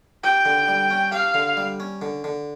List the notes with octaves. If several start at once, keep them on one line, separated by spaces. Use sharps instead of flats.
G4 G5
D3
G3
C#4
G4 F5
D3
G3
C#4
D3
D3